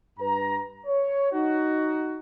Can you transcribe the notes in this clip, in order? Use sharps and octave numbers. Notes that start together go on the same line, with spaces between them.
G2 B4 A#5
C#5
D#4 F#4